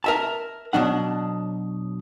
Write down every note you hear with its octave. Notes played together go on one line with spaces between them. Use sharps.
A#4 E5 A5
B2 F#3 D4 F#5